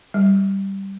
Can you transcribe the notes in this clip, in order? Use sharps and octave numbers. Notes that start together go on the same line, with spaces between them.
G3